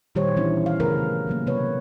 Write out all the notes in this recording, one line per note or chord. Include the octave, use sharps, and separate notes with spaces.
A#2 D#3 G3 G4 C5 C#5
E3 B3 C#4 D4 E4
F5
C#3 A3 G#4 A#4 B4
C#3 F#3 A#3
C3 B3 B4 C#5